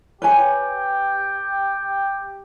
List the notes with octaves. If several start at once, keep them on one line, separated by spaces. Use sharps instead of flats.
G4 B4 C#5 G5 G#5